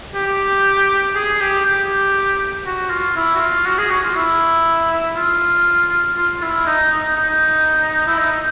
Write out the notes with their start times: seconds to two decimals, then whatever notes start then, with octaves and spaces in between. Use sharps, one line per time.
0.14 G4
1.15 G#4
1.41 G4
1.65 G4
2.66 F#4
2.90 F4
3.16 E4
3.35 F#4
3.40 F4
3.66 F#4
3.78 G#4
3.90 F#4
4.04 F4
4.16 E4
5.16 F4
6.17 F4
6.42 E4
6.66 D#4
6.92 D#4
7.17 D#4
8.07 E4
8.17 D#4